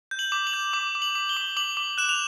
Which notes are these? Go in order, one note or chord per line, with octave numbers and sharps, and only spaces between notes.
G6
F#7
D6
F#7
G6
D6
D6
F#7
D6
G7
D6
D6 F#7
D6
F#6 E7
F7